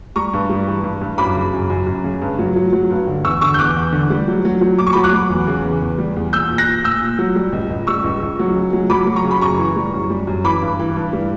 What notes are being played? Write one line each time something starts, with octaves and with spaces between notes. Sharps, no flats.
G3 A#5 C#6
G2
G3
E3
G2
G2
F#2 B5 D6
C#3
F#2
F#2
F#2
C#3
G2
F#3
F#3
F#3
G2
D3
E2 C#6 E6
D3 C#6 E6
G6
E2 D6 F#6
E2
D3
G3
F#3
F#3
F#3
A#2 D6
C#6
F#3 B5 D6
D6 F#6
F#3
E2
C#3
E2
E2
G3
E2
A#2 E6 G6
A#2
F#6 A#6
A#2
A#2 E6 G6
A#2
F#3
G3
C#2
C#2
G3 C#6 E6
C#2
C#2
F#3
C#3
F#3
F#3 B5 D6
F#3
A#5 C#6
C#3
B5
F#2 A#5 C#6
E3
G3
F#2
G3
F#2
E3 B5 D6
G2
E3
G2
G3